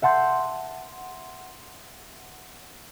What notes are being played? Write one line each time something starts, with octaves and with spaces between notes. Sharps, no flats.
E5 F#5 A5 C6 G6